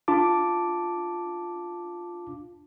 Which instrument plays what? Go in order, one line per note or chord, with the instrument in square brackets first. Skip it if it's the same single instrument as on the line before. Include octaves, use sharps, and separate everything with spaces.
[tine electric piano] D4 F4 A5 D6